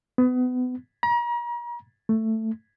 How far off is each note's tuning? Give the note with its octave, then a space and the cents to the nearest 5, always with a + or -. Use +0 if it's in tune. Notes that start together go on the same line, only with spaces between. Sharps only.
B3 +30
A#5 +40
A3 +10